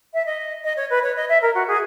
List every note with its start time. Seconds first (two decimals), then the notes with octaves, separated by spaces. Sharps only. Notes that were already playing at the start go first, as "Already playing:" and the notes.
0.14 E5
0.26 D#5
0.64 D#5
0.77 C#5
0.90 B4
1.03 C#5
1.16 D#5
1.29 E5
1.42 A#4
1.55 F#4
1.68 G#4